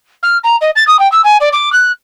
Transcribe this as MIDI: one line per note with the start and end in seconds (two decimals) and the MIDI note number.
0.23 0.38 89
0.44 0.56 82
0.61 0.70 75
0.76 0.86 93
0.87 0.99 87
0.99 1.10 79
1.12 1.21 88
1.24 1.37 80
1.40 1.49 74
1.53 1.72 86
1.72 1.92 90